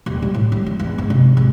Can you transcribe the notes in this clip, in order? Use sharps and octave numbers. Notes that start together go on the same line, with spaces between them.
D#1
G3
A2
G3
C4
E2
G#2
C3
G#1